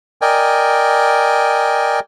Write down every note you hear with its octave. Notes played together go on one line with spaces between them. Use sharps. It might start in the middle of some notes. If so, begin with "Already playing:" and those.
A#4 D5 D#5 G5 G#5